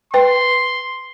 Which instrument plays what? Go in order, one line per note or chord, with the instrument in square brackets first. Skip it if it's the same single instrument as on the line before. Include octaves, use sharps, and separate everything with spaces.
[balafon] B4 G5 [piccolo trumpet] C6